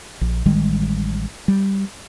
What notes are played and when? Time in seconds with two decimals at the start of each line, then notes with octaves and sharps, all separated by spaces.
0.21 A#1
0.46 A1 D#3 G3 G#3
1.48 G3